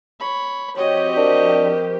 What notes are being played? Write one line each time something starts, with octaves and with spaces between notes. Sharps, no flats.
C#5 B5
F3 C4 F#4 G4 C#5 D#5
D4 A#4